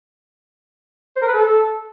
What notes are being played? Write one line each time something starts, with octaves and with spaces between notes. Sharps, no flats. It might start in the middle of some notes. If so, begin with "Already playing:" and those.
C5
A#4
B4
A4